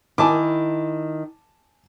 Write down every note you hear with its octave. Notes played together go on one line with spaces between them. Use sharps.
D#3 E4 G#5 A5 D6